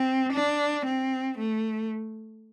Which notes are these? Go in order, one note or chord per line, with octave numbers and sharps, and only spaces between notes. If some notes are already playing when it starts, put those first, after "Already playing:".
Already playing: C4
D4
C4
A3